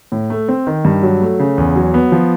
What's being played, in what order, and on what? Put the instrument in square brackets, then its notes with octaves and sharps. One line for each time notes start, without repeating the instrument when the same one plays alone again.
[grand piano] A2
A3
C4
D#3
G2
F#3
A3
C#3
E2
F#3
B3
F3